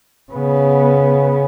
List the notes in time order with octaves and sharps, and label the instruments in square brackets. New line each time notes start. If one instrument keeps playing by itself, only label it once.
[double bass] C#3 B3